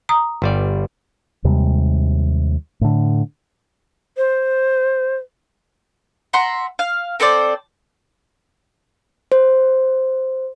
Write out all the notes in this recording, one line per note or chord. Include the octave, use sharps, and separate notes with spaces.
A#5 D#6
G1 G3 D5
D#2 C3 G3 G#3
A2 D3
C5
E5 F#5 A#5 C6
F5
C4 A4 C5 D5
C5